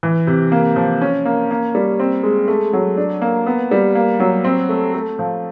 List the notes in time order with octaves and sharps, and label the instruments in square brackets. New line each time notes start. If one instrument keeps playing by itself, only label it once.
[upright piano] E3
C3
A#3
F3
C#4
A#3
A#3
G3
C4
G#3
A3
F#3
D4
A#3
B3
G3
A#3
F#3
C4
A3
A3
F3